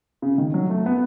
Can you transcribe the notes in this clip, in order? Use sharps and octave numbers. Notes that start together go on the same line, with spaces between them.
C#3
D#3
F#3
A3
B3